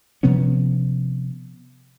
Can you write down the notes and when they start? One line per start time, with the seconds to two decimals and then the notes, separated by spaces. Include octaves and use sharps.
0.23 C3 F3 B3 C#4